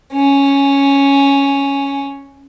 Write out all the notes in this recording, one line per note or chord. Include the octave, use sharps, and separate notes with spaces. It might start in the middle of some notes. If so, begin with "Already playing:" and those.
C#4